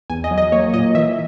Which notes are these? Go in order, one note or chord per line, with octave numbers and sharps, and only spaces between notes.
E2 G#5
D#5
F#3
D#5
A#3 C#5
A#2 D#5
E3 E5